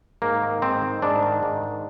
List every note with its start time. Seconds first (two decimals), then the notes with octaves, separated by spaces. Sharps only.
0.22 G#2 A#3
0.42 D#3
0.62 G#2 C4
0.82 D#3
1.02 G#2 D4
1.23 D#3
1.43 G#2
1.64 D#3